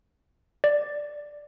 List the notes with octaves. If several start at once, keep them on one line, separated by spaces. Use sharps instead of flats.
D5